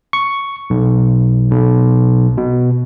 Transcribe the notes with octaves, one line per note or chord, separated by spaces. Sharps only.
C#6
B1
B1
B2